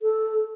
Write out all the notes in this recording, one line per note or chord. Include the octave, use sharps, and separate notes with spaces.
A4